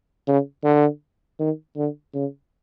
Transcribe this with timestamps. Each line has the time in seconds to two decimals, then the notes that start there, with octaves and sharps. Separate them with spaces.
0.27 C#3
0.64 D3
1.39 D#3
1.76 D3
2.14 C#3